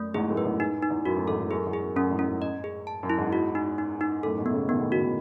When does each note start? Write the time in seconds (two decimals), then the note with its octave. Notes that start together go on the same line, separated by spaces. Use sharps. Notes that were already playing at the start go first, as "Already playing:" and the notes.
Already playing: F#2 A3
0.14 E2 G#2 G#4
0.29 F#2 A2
0.37 B4
0.45 E2 G#2
0.60 D#4
0.83 D#4
0.90 E2
1.06 F#2 F#4
1.17 F#2 A2
1.28 E2 G#2 A4
1.39 E2 G#2
1.50 F#2 G#4
1.66 E2
1.73 G#4
1.81 F#2
1.96 F#2 C#4
2.04 A2
2.11 E2 G#2
2.19 C#4
2.26 F#2
2.42 D#5
2.64 G#4
2.87 A5
3.03 F#2
3.10 E4
3.17 E2 G#2
3.33 F#4
3.55 D#4
3.78 D#4
4.01 D#4
4.23 F#2 A2 A4
4.38 G#2 B2
4.46 B3
4.53 A2 C#3
4.69 B2 D#3 B3
4.80 A2 C#3
4.92 B2 D#3 F#4
5.03 B2 D#3